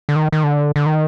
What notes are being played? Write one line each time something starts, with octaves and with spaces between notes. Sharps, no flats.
D3
D#3
D#3
D3
D3
D#3